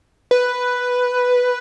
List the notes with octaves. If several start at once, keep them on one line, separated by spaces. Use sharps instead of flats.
B4